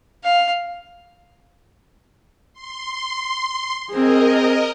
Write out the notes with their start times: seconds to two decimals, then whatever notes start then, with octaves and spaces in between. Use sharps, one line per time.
0.24 F5
2.53 C6
3.91 C4 G#4 A#4 D#5